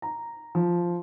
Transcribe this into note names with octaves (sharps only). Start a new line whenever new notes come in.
A#5
F3